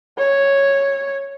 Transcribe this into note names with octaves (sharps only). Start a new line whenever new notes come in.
C#5